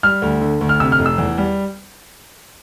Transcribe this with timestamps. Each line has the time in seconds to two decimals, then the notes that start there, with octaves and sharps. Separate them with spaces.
0.03 G3 F6
0.22 D2
0.41 D3
0.61 D2
0.69 F6
0.80 C3 E6
0.92 F6
0.99 F1
1.06 E6
1.18 E2
1.38 G3